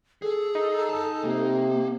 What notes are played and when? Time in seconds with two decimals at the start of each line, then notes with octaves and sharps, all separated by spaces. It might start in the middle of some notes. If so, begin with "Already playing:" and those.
0.22 G#4 A4
0.55 D#4
0.89 G#5 A5
1.24 C3 A#3